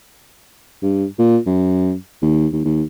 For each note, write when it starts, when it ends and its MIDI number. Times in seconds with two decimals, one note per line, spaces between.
0.82 1.05 43
1.18 1.38 46
1.46 1.94 42
2.22 2.47 39
2.52 2.61 39
2.65 2.83 39